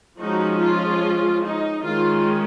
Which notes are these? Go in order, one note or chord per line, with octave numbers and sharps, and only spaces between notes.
F3 G#3 C#4 D#4 F#4
F4
D#4
D#3 G#3 C#4 F4